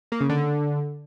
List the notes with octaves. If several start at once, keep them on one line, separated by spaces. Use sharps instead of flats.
A#3
C#3
D3